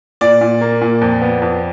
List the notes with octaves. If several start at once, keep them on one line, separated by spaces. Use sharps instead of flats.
A#2 D5
A#2
A#3
A#2
F2
B3
F2